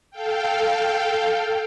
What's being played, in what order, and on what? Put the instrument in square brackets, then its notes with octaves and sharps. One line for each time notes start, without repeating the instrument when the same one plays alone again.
[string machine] A4 F5 G5